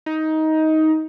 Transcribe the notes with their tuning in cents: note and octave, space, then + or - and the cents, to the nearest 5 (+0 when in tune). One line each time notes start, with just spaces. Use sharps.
D#4 +15